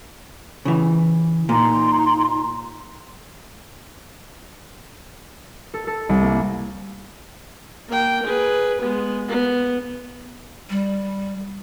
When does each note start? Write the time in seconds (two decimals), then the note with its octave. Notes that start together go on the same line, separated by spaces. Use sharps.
0.65 C#3 E3
1.49 A#2 D#4 A#5 C6
5.74 A4
5.87 A4
6.09 C2
6.22 A#3
7.88 A#3 G5
8.24 G#4 B4
8.82 G#3 B3
9.28 B3
10.70 G3